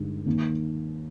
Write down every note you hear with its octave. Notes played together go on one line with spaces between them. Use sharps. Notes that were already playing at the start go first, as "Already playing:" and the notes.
Already playing: G2 D3 G#3 D#4
D#2 D#3 A#3